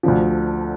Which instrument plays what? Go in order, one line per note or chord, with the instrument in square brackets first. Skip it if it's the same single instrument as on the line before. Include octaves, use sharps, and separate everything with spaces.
[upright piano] D2 D3 F3